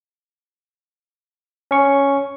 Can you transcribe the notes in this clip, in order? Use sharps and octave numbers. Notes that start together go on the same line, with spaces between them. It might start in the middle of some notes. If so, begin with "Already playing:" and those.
C#4 C#6